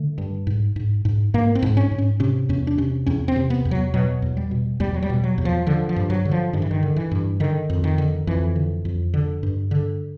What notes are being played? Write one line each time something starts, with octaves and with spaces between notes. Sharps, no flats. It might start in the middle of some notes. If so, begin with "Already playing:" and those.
Already playing: D3 A3
G2
G#2
G#2
G#2
G#2 A#3
C4
G#2
C#4
G#2
C#4
C3 C#4
E2 C#4
D4
C3 C#4
E2 C#4
C4
C3
B3
E2
F#3
B2 F#3
E2
G3
B2
E2 G3
F#3
G3
B2
F#3
E2
F3
D3 F3
F3
G2
F#3
D3
F3
G2 D#3
E3
D#3
D3
E3
G2
D3 D#3
F2
D#3
D3
F2 E3
D3
F2
D3
G2
D3